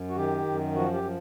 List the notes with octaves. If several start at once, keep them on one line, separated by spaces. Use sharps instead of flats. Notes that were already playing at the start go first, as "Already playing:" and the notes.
Already playing: F#2
F#4
D#3 G4
F#2
F3 F#4
G4
F3